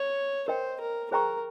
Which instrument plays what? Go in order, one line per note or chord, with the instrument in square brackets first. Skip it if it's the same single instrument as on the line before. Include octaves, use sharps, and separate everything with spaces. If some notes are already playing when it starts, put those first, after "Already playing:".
Already playing: [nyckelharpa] C#5
[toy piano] A#4 D#5 G5 [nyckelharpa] C5
[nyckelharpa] A#4
[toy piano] G#4 C5 G5 A#5 C#6 [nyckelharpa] A#4